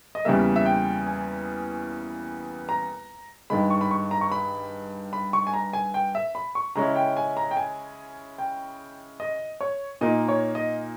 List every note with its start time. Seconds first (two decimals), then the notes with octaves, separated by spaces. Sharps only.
0.15 D#5
0.25 E2 C#3 G3 A#3 E5
0.56 E5
0.66 G5
1.07 G#5
2.69 A#5
3.50 G2 D#3 G#3 B5
3.70 C#6
3.81 B5
3.91 C#6
4.11 A#5
4.21 C#6
4.32 B5
5.13 B5
5.33 C#6
5.47 G#5
5.54 A#5
5.73 G#5
5.94 G5
6.15 E5
6.35 B5
6.55 C#6
6.75 C#3 G#3 C#4 E4 A#5
6.96 G5
7.17 G#5
7.37 A#5
7.51 G5
7.57 G#5
8.38 G5
9.20 D#5
9.61 C#5
10.01 A#2 A#3 D#4 D#5
10.28 C#5
10.55 D#5